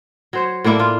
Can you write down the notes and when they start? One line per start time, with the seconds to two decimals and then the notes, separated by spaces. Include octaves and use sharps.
0.33 F#3 C5 C#5
0.64 A2 A#3 D4 E4
0.79 F4